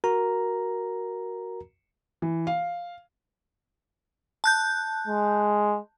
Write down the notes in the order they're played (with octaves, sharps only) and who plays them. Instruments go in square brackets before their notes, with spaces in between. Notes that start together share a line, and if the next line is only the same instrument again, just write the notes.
[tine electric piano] F#4 A#4 A#5
[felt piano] E3
F5
[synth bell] A5 F#6 G6
[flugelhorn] G#3